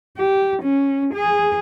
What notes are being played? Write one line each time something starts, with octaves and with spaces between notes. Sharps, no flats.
G4
C#4
G#4